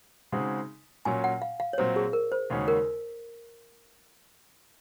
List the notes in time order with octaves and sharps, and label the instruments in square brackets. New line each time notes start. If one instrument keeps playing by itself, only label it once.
[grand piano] C#3 G#3 C4 D#4 F#4
[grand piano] A#2 F#3 C#4 [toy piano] G#5
[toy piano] F#5
F5
F5
C#5
[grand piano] A#2 F#3 C4 [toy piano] C5
[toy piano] G#4
A#4
C5
[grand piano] D#2 C#3 G#3 C#4 F#4
[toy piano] A#4